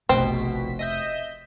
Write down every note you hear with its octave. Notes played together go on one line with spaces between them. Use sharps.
F1 A#1 B2 C4 B6
D#5 E5 G6